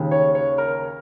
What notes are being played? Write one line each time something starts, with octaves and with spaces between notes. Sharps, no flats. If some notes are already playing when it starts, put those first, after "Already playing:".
Already playing: D#2 C#3
C#5
C#5
A#4